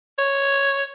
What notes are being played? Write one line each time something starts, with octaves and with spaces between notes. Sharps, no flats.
C#5